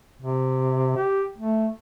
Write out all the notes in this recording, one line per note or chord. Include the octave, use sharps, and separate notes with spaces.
C3
G4
A3